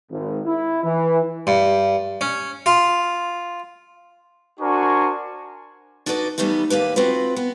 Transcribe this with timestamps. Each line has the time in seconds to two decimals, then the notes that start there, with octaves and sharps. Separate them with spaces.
0.11 G#1
0.46 E4
0.84 E3
1.47 G2
2.21 C#4
2.66 F4
4.60 D4 F#4 A#4 C5 G#5 C#6
6.06 D4 D#4 F#4 B4 C#5 D5
6.38 E3 F3 G3 A3 B3 D#4
6.70 D#2 A#3 G4 B4
6.96 C4 F4 F#4 B4
7.36 B3